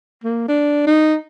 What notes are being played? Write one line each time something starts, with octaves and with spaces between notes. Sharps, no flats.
A#3
D4
D#4